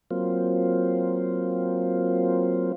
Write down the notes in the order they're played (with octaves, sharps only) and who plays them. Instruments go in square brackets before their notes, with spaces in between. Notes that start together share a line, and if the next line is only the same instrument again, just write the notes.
[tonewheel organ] F#3 A#3 C4 F4